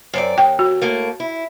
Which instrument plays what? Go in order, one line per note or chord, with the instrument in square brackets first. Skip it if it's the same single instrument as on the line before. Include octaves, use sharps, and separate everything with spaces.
[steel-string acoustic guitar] F#2 C4 D5
[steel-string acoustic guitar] D#2 [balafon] G5
[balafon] F#4
[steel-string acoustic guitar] A2 A3 A#3
E4